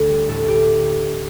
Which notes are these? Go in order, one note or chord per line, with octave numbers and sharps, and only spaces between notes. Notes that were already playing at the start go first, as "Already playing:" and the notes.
Already playing: D2 D3
G3
A2 A4
A2 G4